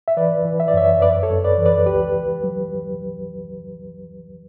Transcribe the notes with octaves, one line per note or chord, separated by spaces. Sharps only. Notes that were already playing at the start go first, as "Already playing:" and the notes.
E5
E3 B4 D5
E3
E5
D5
F#2 C#5 E5
F#2 B4 D5
A4 C#5
F#2
B4 D5
E3
B4 D5
C#2 G4 B4
C#2
F#3